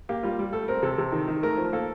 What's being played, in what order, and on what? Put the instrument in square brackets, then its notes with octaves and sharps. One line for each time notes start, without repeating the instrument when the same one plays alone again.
[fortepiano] A#3 G4
G3 F4
G3
A3 A4
C4 A#4
C3 A4
C3
D#3
D#3
A3 A#4
F3
A#3 A4